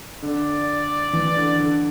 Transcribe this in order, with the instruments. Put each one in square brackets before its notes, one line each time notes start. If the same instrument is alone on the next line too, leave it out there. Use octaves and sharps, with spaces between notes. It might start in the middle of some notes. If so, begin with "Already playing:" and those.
[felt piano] D3 [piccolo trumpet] D5
[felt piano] E3
D3
D3